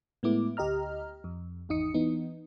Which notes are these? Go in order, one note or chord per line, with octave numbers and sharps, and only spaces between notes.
A2 G#3 A3 B3 E4 D6
D2 G4 D#5 A#5 F6
F2
G#1 E2 D#4 D#6 C#7
E3 B3 D#4